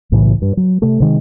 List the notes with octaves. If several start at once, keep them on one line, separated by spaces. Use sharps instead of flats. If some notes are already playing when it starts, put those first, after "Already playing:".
B1 A2 C#3 E3
G2
F#3
C3 A3
C3 D#3 G#3